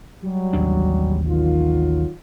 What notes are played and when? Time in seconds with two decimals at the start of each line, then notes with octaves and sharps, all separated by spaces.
0.23 F#3 G3
0.53 A1 D#2 D4
1.27 D#3 F#3 F4